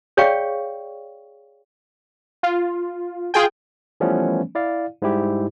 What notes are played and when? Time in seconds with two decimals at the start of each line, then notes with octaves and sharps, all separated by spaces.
0.17 G#4 C#5 D5 F5 G5 C#6
2.43 F4
3.34 F4 G#4 G5
4.00 E3 F3 G3 A3 B3 C#4
4.55 E4 D5 F5
5.02 G#2 G3 E4 G4